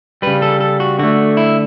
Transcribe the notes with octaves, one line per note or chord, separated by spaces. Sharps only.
C#3 G3 B4
A4
A4
F#4
D3 A3 F#4
E4